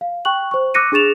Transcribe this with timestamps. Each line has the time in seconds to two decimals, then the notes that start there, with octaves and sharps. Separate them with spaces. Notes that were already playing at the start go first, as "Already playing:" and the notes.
0.01 F5
0.25 G5 C#6 F#6 F#7
0.51 C5 C#6
0.74 D6 E6 F#6 A#6 C#7 D#7
0.92 D4 G#4 C#6 A6 E7 F7